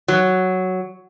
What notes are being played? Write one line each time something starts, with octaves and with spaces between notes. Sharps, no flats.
F#3